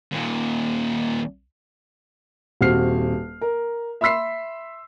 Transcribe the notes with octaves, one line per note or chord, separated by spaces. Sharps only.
D#2 A#2
D#1 C4 F#4 F6 C7
A#4
E5 B5 C6 E6 B6 C7